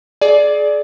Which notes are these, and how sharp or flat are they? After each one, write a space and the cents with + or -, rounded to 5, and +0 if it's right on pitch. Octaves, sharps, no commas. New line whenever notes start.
G#4 +30 D5 +0